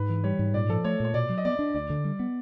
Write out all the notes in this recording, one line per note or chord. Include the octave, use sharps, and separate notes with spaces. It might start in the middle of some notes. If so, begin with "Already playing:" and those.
Already playing: G#2 B4
E3
G3 C#5
G#2
A#2 D5
F3 A4
A3 C#5
A#2 C#5
B2 D5
F#3
D#5
B3 D5
D4
D2 D5
D3
G3
B3